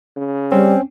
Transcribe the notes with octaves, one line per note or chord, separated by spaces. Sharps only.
C#3
G3 C4 C#4